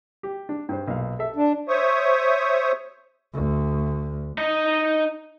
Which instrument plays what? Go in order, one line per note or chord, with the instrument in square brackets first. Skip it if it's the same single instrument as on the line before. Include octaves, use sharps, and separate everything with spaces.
[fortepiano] G4
D4
G2 C5
B1 A#2 F5
A4 E5
[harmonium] D4
[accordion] C5 C#5 E5 C#6 D#6
[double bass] D2
[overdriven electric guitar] D#4 D#5